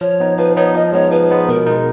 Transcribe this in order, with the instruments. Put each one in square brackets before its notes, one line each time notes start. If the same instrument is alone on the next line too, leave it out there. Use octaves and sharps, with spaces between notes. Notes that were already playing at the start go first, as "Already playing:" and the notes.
[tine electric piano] F3 [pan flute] C#5
[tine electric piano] B3 D#4
[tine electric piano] F3 [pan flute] B4
[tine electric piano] B3 D#4 [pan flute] C#5
[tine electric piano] F3 [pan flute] D#5
[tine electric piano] G#3 B3 D#4 [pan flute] C#5
[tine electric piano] F3 [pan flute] B4
[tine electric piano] G#3 B3 D#4
[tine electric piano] B2 [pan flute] A#4
[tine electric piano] G#3 D#4